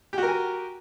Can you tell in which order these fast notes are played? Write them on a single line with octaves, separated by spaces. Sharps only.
G4 F#4 A#4 G#5